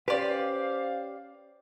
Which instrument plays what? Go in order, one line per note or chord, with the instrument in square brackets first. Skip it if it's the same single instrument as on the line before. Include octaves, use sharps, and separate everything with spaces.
[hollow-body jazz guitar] C#4 B4 [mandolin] G4 D5 [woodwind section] C5 F5